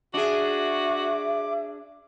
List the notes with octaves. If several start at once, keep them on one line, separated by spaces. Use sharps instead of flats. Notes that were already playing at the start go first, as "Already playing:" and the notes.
D4 F#4 G#4 E5 D6